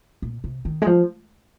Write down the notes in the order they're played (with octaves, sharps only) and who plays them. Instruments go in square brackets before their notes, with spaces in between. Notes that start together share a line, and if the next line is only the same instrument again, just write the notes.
[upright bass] A#2
C3
D#3
G#3
F3